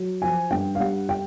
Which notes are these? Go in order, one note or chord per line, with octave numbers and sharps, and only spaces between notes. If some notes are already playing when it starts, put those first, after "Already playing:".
Already playing: F#3
F3 G#5
G2 G5
F5
G3 F#5
G5